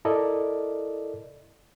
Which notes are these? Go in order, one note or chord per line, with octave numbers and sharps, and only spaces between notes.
E4 A4 A#4 D5 D#5